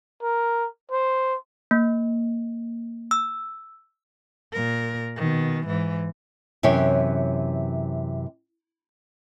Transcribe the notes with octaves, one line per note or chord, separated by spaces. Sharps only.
A#4
C5
A#3
E6
A#2 A#4
B2 D#3
G#2 E3
F#2 C3 E3 C#5 G5